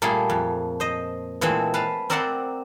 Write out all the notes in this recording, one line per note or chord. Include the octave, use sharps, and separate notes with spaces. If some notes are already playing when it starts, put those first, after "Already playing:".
A#2 G3 A3 A#3 G#4
F2
C5 D#5
A#2 E3 G#3 A3 C4
B4 F5 A5
C4 A#4 D5 E5 F#5 C6